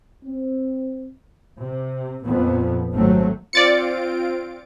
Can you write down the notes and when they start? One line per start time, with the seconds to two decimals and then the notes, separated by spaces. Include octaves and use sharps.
0.24 C4
1.59 C3
2.24 F2 A#2 B3
2.92 G#1 D#2 F#3 A3 C4
3.53 C4 F4 D5 A6 C#7 D7